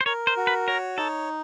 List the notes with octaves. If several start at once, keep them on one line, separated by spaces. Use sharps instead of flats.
C5
A#4 C#5
C5
F#4
B4
A#4 C#5
D#4 A4